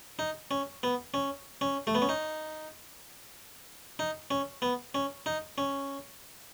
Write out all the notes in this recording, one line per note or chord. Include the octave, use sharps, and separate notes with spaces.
D#4
C#4
B3
C#4
C#4
A3
B3
C#4
D#4
D#4
C#4
B3
C#4
D#4
C#4